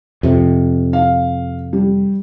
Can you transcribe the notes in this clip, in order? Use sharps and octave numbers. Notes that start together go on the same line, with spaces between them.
F2 C3
F5
G3